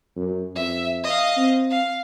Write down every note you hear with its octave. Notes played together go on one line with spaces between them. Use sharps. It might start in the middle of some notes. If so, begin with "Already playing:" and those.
F#2
F2 E5
D#5 F5
C4
F5